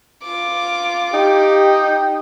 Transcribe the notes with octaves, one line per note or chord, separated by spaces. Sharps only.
F4 D6
D#4 G4 G5